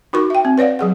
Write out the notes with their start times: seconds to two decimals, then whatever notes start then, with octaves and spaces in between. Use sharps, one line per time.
0.13 D#4 F#4 A#4 C#6
0.30 E5 G5
0.45 C4
0.58 B4 C#5 D5 F5 F#5
0.79 F#3 G#4 F#5